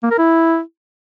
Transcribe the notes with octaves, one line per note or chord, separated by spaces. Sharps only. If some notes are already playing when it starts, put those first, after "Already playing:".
A#3
A#4
E4